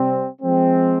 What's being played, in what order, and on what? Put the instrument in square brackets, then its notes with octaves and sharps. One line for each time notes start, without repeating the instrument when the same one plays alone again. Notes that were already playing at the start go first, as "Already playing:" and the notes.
Already playing: [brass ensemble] C3 G3 C4
F3 G#3 C4